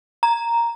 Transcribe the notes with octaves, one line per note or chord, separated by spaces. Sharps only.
A#5